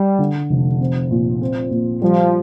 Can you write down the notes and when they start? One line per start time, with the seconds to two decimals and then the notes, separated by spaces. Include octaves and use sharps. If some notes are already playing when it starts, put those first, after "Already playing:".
Already playing: G3
0.19 D3
0.50 F1
0.80 C4
1.10 A#2
1.42 C4
1.71 A#2
2.02 F3 G3